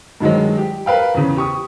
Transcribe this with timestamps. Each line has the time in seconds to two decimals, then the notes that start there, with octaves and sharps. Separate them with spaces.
0.20 G2 D#3 F#3 G#3
0.58 G4
0.86 A#4 B4 F5 G5
1.15 E2 C#3
1.37 G4 C#6 D#6